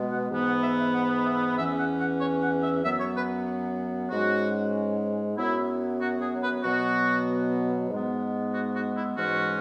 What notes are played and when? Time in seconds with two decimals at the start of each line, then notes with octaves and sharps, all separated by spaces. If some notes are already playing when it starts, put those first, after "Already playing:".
Already playing: B2 G#3 B3
0.10 F#5
0.31 G#2 E3 B3
0.46 F#5
0.63 E5
0.78 E5
0.94 F#5
1.25 E5
1.57 E2 E3 C#4 E5
1.78 F#5
1.99 F#5
2.20 C#5
2.41 F#5
2.62 E5
2.83 F#2 F#3 B3 E5
2.99 C#5
3.15 B4
4.10 G#2 G#3 C#4 F#4
5.37 F#2 F#3 B3 E4
6.00 F#4
6.20 G#4
6.42 B4
6.62 B2 F#3 B3 F#4
7.89 G#2 G#3 B3
8.52 F#4
8.74 F#4
8.94 E4
9.16 G#2 E3 G#3 C#4 F#4